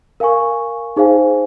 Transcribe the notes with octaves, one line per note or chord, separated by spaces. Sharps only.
A#4 F5 G#5 C#6
D#4 G#4 C5 F5 G#5